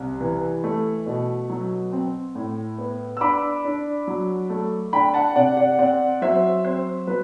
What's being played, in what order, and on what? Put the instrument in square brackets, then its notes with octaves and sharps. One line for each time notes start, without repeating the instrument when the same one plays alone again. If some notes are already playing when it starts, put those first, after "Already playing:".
Already playing: [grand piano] C2 C3
E3
A3
B2
F#3
C4
A2
B3
E6
D4 B5 D6
D4
F#3
A3
D4 G5 B5
F#5 A5
C3 D5 F#5
D5 F#5
C4 D5 F#5
F#3 C5 E5
C4 C5
F#3 B4